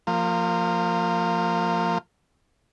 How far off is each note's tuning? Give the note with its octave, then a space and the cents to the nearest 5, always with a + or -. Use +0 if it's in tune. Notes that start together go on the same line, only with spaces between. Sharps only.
F3 +0 A#3 -30